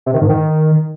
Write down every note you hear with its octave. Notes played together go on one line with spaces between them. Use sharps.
C3
D#3
G#2
D#3